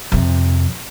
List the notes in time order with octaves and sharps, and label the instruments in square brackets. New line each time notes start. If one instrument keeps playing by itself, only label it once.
[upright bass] F2 C3